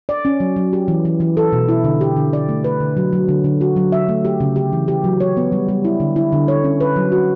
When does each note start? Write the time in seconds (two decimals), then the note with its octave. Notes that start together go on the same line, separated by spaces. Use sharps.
0.09 D5
0.25 C#4
0.40 F#3
0.56 F#3
0.73 G4
0.88 E3
1.05 E3
1.20 E3
1.37 A4
1.53 B2
1.69 E4
1.84 D3
2.01 G4
2.17 D3
2.33 D5
2.49 A3
2.64 B4
2.80 D3
2.97 F#3
3.13 F#3
3.29 D3
3.44 D3
3.61 F#4
3.76 F#3
3.92 E5
4.09 A3
4.25 G4
4.40 C#3
4.56 G4
4.73 E3
4.88 G4
5.04 F#3
5.20 C#5
5.37 B3
5.52 G3
5.69 G3
5.85 E4
6.00 D3
6.16 E4
6.32 D3
6.48 C#5
6.64 C#4
6.80 B4
6.96 F#3
7.12 F#4